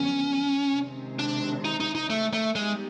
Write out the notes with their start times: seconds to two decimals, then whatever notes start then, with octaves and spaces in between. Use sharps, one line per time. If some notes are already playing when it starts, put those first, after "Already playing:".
Already playing: F2 D3 F#3 B3 C#4
0.73 C3 D#3 G#3 C4
1.19 D4
1.65 D#4
1.80 D#4
1.95 D#4
2.10 A3
2.33 A3
2.55 G3 G#3 B3 D#4 G4